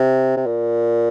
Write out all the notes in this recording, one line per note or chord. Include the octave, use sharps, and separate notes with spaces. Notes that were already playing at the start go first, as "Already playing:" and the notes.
Already playing: C3
C3
A#2